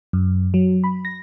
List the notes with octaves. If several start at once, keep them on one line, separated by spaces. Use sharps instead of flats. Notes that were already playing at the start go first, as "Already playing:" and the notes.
F#2
F#3
B5
A#6